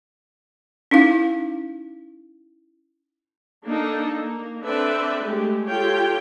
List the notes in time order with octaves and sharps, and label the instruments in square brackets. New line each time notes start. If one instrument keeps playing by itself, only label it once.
[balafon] C#4 D#4 E4 F5
[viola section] A#3 D4 D#4 A4
A#3
C4 D4 A4 B4 D5 E5
G#3 A3 G4
F4 G4 A4 C#5 G5